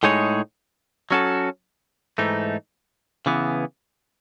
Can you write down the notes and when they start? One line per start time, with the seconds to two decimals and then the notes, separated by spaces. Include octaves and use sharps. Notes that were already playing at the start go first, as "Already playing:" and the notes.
0.03 A2 G#3 D#4 G#4 C#5
1.11 F#3 C#4 F#4 A4
2.18 G#2 E3 A3 D#4
3.26 C#3 E3 B3